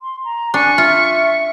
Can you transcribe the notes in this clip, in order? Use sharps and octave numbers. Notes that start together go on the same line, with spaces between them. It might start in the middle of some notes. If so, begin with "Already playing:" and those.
C6
A#5
D4 G#5 C#6
F4 E5